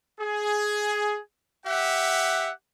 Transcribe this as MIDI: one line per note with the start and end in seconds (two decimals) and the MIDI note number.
0.20 1.18 68
1.65 2.50 67
1.65 2.50 76
1.65 2.50 78